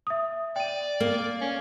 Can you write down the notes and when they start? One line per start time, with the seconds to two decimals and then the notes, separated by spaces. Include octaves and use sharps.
0.07 E5 D#6
0.56 D5 G5 D#7
1.00 A#3
1.41 C#4